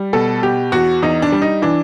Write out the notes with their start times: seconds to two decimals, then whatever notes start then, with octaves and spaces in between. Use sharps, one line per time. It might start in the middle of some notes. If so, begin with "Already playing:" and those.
Already playing: G3
0.13 B2 A4
0.42 B2 G4
0.72 E2 F#4
1.02 E2 D#4
1.22 D4
1.32 G3
1.42 D#4
1.62 E3 D4